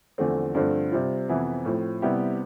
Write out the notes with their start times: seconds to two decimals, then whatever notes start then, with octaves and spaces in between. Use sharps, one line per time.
0.18 E2 D3 F3 A3 C4
0.55 G2 D3 F3 A3 C4
0.91 C3 G3 C4 F4
1.29 F2 C3 E3 B3 E4
1.65 A2 F3 C4
2.02 C3 G3 B3 E4 G4